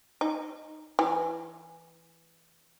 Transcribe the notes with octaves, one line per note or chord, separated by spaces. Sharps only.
D#4
E3